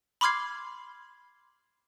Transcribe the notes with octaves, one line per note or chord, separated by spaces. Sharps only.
B5 C6 D6 F6 G#6 C7